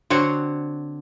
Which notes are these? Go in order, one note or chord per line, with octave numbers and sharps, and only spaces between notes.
D3 C4 F#4 C#5